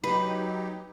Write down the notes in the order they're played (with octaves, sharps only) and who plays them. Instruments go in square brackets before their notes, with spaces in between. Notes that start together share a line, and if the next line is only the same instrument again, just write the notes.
[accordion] F#3 D#4 G4 [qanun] B4